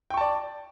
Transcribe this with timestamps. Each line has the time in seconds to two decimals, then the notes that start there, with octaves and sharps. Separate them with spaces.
0.10 G5
0.14 C#6
0.17 A5
0.21 D5